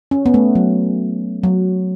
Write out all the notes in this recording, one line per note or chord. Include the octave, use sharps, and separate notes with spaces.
C#4
B3
A3
F#3
F#3